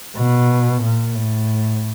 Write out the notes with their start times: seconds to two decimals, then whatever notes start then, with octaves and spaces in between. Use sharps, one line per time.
0.17 B2
0.83 A#2
1.15 A2